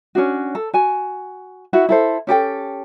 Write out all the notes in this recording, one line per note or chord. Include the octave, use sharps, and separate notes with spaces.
C#4 D4 F#4
A4
F#4 G#5
E4 F#4 F#5
E4 A4 C5
C#4 G4 A4 G5